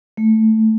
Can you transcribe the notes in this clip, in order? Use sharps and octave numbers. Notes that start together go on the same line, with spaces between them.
A3